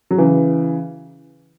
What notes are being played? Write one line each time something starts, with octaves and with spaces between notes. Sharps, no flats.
F#3
C#3 E3